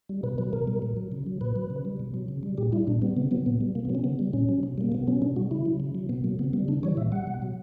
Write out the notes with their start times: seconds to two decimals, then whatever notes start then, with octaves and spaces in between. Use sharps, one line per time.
0.09 G3
0.23 B2 B4
0.38 F#3 B4
0.53 B2 A#4
0.67 G3
0.82 A#2
0.97 F#3
1.12 C#3
1.26 F#3
1.41 A#2 B4
1.56 F#3
1.70 C#3
1.85 G3
1.99 B2
2.14 F#3
2.28 C#3
2.43 G3
2.58 A#2 G4
2.72 G3 E4
2.87 A#2 D4
3.02 G3 B3
3.17 C#3 B3
3.31 F#3 B3
3.46 A#2 B3
3.61 G3
3.75 B2 A#3
3.85 B3
3.89 F#3
3.95 C#4
4.04 C#3 B3
4.19 G3
4.33 A#2 C#4
4.49 F#3
4.63 B2
4.78 G3 A#3
4.92 B2 B3
5.07 F#3 C#4
5.22 B2 D4
5.36 G3 F#4
5.51 C#3 E4
5.66 F#3
5.80 C#3
5.95 F#3
6.09 B2 B3
6.24 F#3 A#3
6.39 C#3 B3
6.53 G3 B3
6.68 C#3 D4
6.83 E3 G3 C#5
6.97 A#2 E5
7.12 G3 F#5
7.27 B2
7.42 F#3